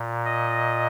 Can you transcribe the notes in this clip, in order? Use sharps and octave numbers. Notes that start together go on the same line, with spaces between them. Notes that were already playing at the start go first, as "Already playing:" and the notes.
Already playing: A#2
D#5